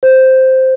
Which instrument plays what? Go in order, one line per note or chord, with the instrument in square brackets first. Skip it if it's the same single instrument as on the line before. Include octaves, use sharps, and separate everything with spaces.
[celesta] C5